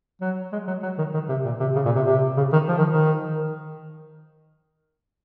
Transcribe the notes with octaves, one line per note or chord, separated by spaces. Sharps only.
F#3
G#3
F#3
F#3
D#3
D#3
C3
A#2
C3
C#3
A#2
C3
C3
C#3
D#3
F3
D#3
D#3